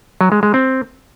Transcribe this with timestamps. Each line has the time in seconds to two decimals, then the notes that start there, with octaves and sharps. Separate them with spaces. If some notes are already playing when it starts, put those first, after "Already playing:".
0.21 F#3
0.32 G#3
0.43 G#3
0.54 C4